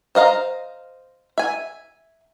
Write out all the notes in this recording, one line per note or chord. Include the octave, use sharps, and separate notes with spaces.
C5 D#5 F5 A#5
E5 G#5